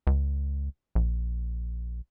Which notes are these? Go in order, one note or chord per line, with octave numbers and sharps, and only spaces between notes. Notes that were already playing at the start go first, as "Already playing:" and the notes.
C#2
A#1